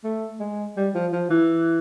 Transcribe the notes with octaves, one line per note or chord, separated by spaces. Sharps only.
A3
G#3
G3
F3
F3
E3